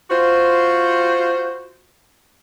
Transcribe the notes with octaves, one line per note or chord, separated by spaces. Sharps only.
F4 F#4 C5